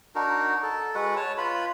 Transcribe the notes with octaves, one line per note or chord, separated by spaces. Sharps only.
D4 D#4 F#4 A#4
A4
G#3 F#4 B4 F#5
C#5 A5
F4 B4 B5